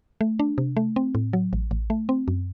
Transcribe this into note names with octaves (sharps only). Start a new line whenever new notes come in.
A3
D4
C3
A3
C4
A2
F#3
A1
A1
A3
C4
F#2